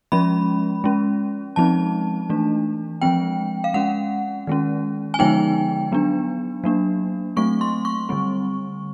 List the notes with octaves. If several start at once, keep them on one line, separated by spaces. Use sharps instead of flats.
F3 G#3 C#4 B5
G#3 C#4
F3 G#3 C4 D#4 A5
E3 A3 D4
F3 G#3 C4 G5
F5
G#3 C#4 F#5
D#3 G#3 C#4
G#5
D3 F3 G#3 B3 D#4 G5
F#3 B3 D4
F#3 A#3 D4
F#3 A3 C4 C#6
C6
C#6
D3 G3 C4